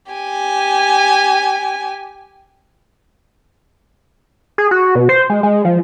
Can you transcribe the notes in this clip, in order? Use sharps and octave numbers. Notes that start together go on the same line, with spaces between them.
G4 G#5
G#4
F#4
B2
C5
G#3
G#3
F3